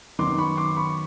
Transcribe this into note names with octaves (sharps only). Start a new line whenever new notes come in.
F#2 D#3 F#3 B3 D#4 C6 D6
B5 C#6
C6 D6
B5 C#6